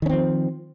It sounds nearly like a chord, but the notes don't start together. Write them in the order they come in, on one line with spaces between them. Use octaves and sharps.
D#3 C#4 C4 F3